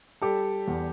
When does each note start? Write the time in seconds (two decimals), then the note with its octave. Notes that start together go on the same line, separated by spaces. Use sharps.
0.22 G3 G4 A4
0.68 E2